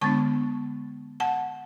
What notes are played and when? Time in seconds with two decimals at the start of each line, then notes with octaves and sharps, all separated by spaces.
0.01 D3 G#3 B3 D4 A5 C#6
1.20 F#5 A5